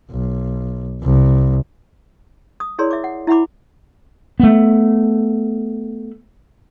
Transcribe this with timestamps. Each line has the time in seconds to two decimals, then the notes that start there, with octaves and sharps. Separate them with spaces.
0.11 B1
1.03 C2
2.60 D#6
2.78 E4 G#4 A#4 C#5 D5 C6
2.91 E5 D6
3.04 F#5
3.27 E4 E5 F#5 B5 D6
4.40 A3 B3